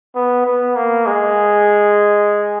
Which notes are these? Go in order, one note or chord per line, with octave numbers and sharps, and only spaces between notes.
B3
B3
A#3
G#3